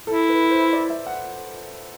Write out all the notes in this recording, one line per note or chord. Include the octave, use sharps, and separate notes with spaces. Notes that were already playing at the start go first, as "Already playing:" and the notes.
E4 A4
B4
C5
D5
E5
F#5